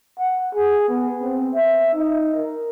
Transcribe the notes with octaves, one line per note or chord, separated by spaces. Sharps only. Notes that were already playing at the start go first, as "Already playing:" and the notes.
F#5
G#4
B3
C4
E5
D#4
A#4